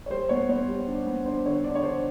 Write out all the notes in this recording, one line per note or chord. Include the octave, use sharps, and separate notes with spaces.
C#5
G3 C5
B3 C#5
B3 C#5
G3
D4
B3
D4 C5
D3 C#5
D4 D5
C#5
D4 C5